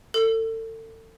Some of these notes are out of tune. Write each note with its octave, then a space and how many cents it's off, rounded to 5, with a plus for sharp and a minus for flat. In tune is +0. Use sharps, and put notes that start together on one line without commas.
A4 +35